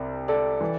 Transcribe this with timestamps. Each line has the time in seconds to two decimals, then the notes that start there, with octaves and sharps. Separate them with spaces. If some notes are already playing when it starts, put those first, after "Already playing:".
Already playing: C2 C3 D5
0.28 A4 D5
0.61 E3